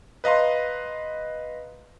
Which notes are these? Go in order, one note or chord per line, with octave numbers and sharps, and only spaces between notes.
B4 D#5 F5 A#5 C6